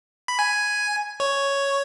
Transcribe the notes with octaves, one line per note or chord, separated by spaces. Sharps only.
B5
G#5
C#5